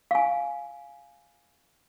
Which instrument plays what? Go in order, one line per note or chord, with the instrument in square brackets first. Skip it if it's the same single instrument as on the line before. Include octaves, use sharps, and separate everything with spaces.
[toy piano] F5 G#5